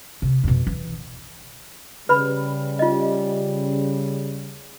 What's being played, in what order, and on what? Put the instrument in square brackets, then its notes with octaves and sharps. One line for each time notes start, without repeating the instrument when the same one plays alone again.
[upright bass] C3
F2 B2
E3
[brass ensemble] C#3 G3 [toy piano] B4 B5
[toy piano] F4 D#5